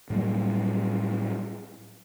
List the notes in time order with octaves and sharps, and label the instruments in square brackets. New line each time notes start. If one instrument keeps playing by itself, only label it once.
[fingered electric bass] A2 F#3 G3 A#3